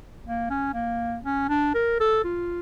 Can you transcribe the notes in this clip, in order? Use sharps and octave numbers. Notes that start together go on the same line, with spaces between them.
A#3
C#4
A#3
C#4
D4
A#4
A4
F4